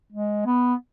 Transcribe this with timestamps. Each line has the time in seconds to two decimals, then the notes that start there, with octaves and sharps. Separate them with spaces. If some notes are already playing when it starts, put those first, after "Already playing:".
0.13 G#3
0.46 B3